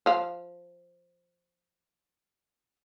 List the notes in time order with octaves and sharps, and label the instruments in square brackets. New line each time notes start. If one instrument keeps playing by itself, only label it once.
[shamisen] F3 F5